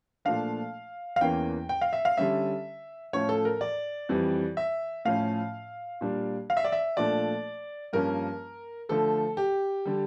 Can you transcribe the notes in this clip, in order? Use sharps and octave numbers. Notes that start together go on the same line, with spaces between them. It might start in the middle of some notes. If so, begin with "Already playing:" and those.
A#2 F3 A3 D4 F5
F5
E2 E3 A#3 C#4 G5
G5
F5
E5
F5
D3 G3 C#4 E5
A2 F3 C#4 C#5
A4
A#4
D5
F2 E3 G3
E5
A2 F3 C#4 F5
A#2 G3 D4
F5
E5
D5
E5
A#2 F3 A3 D4 D5
G2 F3 A#3 C#4 A#4
D3 F3 A3 A4
G4
D3 G3